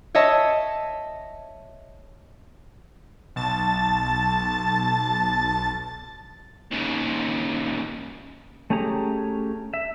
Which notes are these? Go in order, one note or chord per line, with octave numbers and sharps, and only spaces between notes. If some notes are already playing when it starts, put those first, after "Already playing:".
C#5 D#5 E5 A5
B1 A5 A6
D#2 C#3
A3 C#4 G4 G#4 A#5
E5